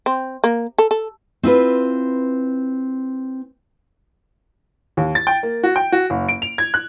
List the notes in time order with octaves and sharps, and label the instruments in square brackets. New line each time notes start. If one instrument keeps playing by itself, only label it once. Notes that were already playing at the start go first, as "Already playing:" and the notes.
[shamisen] C4
A#3
A4
A4
[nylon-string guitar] C4 E4 F4 B4
[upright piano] D#2
A6
G5
A#3
F#4
G5
F#4
F#1
D7
F7
G#6
F#6